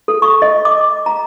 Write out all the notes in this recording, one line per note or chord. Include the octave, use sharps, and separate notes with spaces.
A4
C#6
D#5
D6
A#5